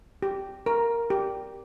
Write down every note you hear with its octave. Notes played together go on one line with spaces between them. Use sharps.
G4
A#4
G4